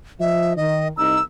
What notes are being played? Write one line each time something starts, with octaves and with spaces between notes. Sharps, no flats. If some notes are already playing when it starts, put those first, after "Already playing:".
F3 D#5 E5
D#3 D#5
C2 D#4 A#5 E6